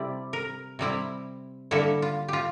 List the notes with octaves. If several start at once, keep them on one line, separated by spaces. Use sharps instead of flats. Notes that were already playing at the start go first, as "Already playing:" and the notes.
Already playing: C3 G3 C4 E4 D5
A#4
C3 G3 C4 E4
D3 G3 A#3 E4 A4
F4
F4 G4